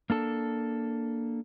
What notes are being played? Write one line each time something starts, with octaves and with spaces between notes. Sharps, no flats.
A#3 D4 A4